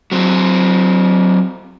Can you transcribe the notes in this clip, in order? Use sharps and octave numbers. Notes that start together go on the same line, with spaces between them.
F#3 C4